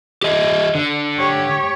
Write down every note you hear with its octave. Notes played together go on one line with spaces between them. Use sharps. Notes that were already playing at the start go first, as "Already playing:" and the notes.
G4 D#5 E5
D3
G4 C#5